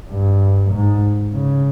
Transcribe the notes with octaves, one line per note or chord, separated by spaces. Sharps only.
G2
G#2
C#3